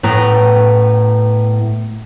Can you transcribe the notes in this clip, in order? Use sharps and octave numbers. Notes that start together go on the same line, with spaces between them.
A2 B3 B4 G5 A#5